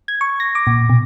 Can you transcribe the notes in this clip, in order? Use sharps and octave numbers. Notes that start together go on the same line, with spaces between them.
G#6
C#6
A#6
D6
A#2
B2